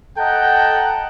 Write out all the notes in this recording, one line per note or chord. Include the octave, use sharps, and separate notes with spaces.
A4 D#5 F#5 G5 A5 A#5